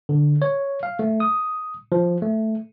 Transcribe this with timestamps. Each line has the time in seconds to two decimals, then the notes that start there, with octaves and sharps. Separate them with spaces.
0.09 D3
0.42 C#5
0.83 F5
0.99 A3
1.20 D#6
1.92 F3
2.22 A3